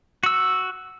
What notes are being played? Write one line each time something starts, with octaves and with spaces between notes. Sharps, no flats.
F#4 E6